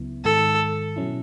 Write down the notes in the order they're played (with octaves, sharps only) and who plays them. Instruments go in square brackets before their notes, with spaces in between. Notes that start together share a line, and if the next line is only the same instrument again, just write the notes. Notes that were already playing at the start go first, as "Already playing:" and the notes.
Already playing: [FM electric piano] C#2 C#3 F#3 B3 E4
[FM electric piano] G#2 D#3 G#3 [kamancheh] A4
[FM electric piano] B2 F#3 C#4 E4